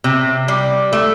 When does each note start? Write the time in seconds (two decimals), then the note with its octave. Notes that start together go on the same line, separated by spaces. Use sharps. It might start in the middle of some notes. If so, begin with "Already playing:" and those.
0.04 C3
0.48 G3
0.93 A3